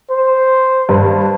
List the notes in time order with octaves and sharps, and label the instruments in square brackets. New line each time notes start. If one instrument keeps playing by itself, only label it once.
[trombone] C5
[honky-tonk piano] G2 B4